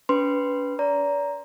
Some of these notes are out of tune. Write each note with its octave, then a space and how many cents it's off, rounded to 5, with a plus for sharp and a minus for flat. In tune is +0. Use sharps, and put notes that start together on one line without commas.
C#4 +45 B4 +0 C6 +0
D5 -35 A#5 +5